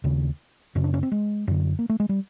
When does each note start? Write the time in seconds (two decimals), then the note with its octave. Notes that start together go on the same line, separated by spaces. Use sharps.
0.04 D#2 C#3
0.75 F#2 C#3 C#4
0.84 D4
0.94 C#4
1.03 C4
1.12 G#3
1.48 F#2 D3
1.79 A#3
1.89 A3
2.00 G#3
2.09 G3